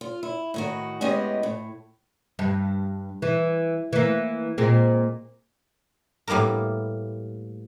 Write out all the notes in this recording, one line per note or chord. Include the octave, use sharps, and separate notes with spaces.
F4
E4
A2 D#3 F#4
A2 G#3 B3 C#4 G4 D#5
A2
G2
E3
E3 A#3
A#2 G#3 C4
A2 G3 A#3 B3 A#4